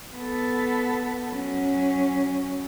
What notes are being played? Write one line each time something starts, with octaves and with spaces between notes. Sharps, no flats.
B3 A4
F#3 C#4